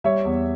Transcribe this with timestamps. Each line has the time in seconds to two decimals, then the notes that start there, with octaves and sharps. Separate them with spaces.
0.04 G3 C#5 E5
0.25 E2